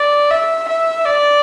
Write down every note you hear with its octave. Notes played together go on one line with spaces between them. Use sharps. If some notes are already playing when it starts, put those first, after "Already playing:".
Already playing: D5
E5
E5
D5